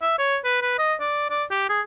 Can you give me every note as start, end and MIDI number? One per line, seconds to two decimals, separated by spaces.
0.02 0.18 76
0.19 0.38 73
0.44 0.60 71
0.62 0.75 71
0.79 0.94 75
1.00 1.25 74
1.30 1.44 74
1.51 1.67 67
1.69 1.81 68